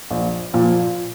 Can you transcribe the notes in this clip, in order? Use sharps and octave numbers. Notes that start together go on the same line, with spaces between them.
A#1
A#2 F3